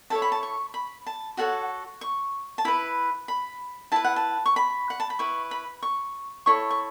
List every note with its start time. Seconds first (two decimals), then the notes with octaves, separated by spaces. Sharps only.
0.10 E4 A4 C#5 A5
0.22 B5
0.32 A5
0.43 C#6
0.74 B5
1.07 A5
1.37 F#4 A4 C#5 F#5
2.01 C#6
2.58 A5
2.65 E4 B4 B5
3.28 B5
3.92 E4 B4 A5
4.04 F#5
4.16 A5
4.46 C#6
4.56 B5
4.90 F#5
5.00 A5
5.10 B5
5.19 E4 B4 C#6
5.51 B5
5.82 C#6
6.46 E4 A4 C#5 C#6
6.71 C#6